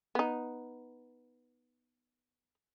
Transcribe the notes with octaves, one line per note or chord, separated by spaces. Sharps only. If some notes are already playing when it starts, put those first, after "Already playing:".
B3 D#4